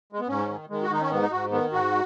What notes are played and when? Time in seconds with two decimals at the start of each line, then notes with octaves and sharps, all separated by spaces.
0.13 G#3
0.20 B3
0.28 G#2 C#4
0.49 D#3
0.70 D#3 G#3
0.82 F#4
0.90 D#3 D#4
1.01 C#4
1.11 G#2 B3
1.22 D#4
1.31 G#2 F#4
1.52 D#3 B3
1.72 G#2 F#4